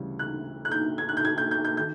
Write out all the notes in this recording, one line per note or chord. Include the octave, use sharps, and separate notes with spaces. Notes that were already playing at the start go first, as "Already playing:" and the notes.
Already playing: D2 C#3 E3 G3
F#6
F#6
G6
G#6
F#6
G6
G#6
G6
G6
G6
D#3 G6